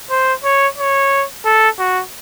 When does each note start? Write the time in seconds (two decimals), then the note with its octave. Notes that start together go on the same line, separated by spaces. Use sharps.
0.10 C5
0.44 C#5
0.78 C#5
1.46 A4
1.79 F#4